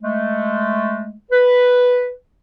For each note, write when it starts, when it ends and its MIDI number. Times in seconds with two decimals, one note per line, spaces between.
0.03 1.15 56
0.03 1.15 57
1.31 2.12 71